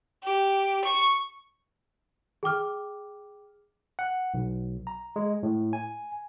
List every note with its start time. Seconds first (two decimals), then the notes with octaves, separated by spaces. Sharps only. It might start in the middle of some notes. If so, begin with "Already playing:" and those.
0.23 G4
0.85 C#6
2.43 G#4 G5 D6 F6
3.99 F#5
4.34 B1
4.87 A#5
5.16 G#3
5.43 A2
5.73 G#5